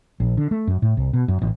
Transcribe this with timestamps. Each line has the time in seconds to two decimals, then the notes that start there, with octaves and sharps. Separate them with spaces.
0.20 A#1
0.37 D3
0.51 A3
0.67 F#2
0.82 A2
0.97 C2
1.13 B2
1.28 F#2
1.42 A1